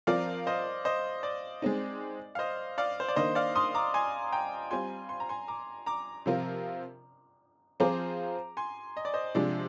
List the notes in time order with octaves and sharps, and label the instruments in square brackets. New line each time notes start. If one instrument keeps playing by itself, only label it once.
[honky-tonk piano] F3 C4 F4 A#4 [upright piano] D5 F5
[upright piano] C5 D#5
C5 D#5
D5
[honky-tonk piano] G#3 C4 D#4
[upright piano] F5
C5 D#5
D5 F5
C5
D5
[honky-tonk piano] D#3 A#3 D4 [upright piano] C5 D#5
[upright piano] D5 F5
C6 D#6
A#5 D6
G#5 C6
G5 A#5
[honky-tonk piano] G3 C4 F4 [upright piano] G#5 C6
[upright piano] C6
A#5
G#5 C6
A#5 D6
A#5 D6
[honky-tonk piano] C3 F3 C4 F4 A#4
[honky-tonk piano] F3 C4 F4 G#4 C5 [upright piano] A#5 D6
[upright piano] G#5 C6
D#5
D5
C5 D#5
[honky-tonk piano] C3 F3 G#3 D4 [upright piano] D5